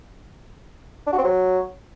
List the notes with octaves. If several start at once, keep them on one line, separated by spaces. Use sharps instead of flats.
D4
F#4
C4
F#3